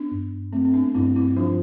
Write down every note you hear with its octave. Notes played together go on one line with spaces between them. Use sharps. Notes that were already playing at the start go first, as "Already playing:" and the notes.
Already playing: B3 D4
G2
A3 C4
C4
B3 D4
G2 C4 E4
C4 E4
F3 D4 F4